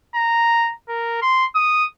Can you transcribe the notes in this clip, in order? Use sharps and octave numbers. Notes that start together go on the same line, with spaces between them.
A#5
A#4
C6
D#6